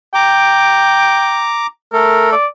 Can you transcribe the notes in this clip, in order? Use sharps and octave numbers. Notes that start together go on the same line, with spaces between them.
G5 A#5 D6
A3 A4 A#4
D5